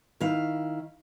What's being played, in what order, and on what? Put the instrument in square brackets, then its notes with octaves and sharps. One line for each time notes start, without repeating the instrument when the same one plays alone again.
[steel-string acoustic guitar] D#3 E4 F5